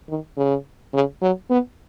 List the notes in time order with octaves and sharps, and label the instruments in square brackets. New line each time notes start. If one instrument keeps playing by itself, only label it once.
[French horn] D#3
C#3
C#3
F#3
B3